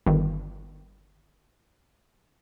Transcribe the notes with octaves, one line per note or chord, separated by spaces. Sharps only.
G1 D#3